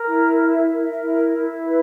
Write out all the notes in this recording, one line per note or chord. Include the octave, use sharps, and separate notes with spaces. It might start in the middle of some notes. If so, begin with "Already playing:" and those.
Already playing: A#4
E4
E5
A#4
E4
E4
B4